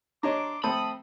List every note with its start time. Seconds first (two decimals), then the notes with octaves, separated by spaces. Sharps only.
0.23 D4 C#5 D#5 A#5 C6 D6
0.64 A3 C4 C5 A5 B5 D#6